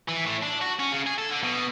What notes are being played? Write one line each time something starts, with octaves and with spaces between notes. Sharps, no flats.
E3
A2
D4
F#4
C#4
C#3
G#4
A4
D3
B2